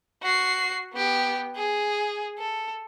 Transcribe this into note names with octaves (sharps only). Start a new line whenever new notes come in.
F#4 C7
B3 G4
G#4
A4